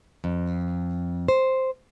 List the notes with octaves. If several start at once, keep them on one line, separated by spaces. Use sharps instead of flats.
F2
C5